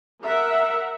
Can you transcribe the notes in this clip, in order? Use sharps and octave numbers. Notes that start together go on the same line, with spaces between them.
A#4 E5 F#5